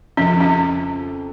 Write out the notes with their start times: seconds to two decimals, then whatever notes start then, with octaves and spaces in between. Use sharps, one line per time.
0.17 F2 C#3 F3 C#4
0.41 C#4